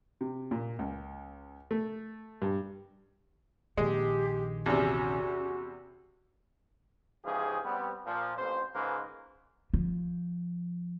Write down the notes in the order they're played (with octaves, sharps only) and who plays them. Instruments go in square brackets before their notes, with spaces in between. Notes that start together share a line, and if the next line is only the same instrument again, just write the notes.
[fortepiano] C3
A#2
C#2
A3
G2
[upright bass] A#1 D#3 [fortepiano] G#3 [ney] G4
[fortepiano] E2 C3 [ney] C#4 [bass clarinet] F#4
[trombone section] G#2 C#3 E3 F3 G4 G#4
G3 B3 C4
A#2 F3
A1 F2 C5
C#2 G#2 C#3 A#3 B4 C5
[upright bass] F3